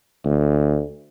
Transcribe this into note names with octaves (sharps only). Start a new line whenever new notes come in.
D2